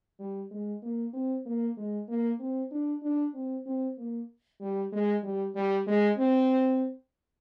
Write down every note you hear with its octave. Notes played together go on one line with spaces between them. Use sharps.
G3
G#3
A#3
C4
A#3
G#3
A#3
C4
D4
D4
C4
C4
A#3
G3
G#3
G3
G3
G#3
C4